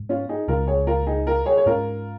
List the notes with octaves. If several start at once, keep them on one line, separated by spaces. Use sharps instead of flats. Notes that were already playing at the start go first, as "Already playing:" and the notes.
Already playing: G#2
C#4 F4
D#4 G#4
C#2 C#3 G#3 F4 A#4
G#4 C#5
F4 A#4
D#4 G#4
F4 A#4
G#4 C#5
C#5
G#2 G#3 C#4 F4 A#4